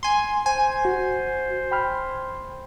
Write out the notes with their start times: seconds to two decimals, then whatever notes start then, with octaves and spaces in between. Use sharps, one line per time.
0.03 G#5 C6
0.46 C5 G#5
0.85 F#4
1.71 G5 B5 F6